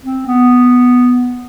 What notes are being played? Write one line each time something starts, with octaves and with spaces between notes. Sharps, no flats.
C4
B3